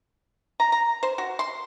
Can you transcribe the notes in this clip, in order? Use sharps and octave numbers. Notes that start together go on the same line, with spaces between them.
A#5
A#5
C5
F#4
C6